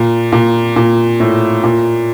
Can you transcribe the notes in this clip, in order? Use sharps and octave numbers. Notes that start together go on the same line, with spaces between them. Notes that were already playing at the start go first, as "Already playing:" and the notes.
Already playing: A#2
A#2
A#2
A2
A#2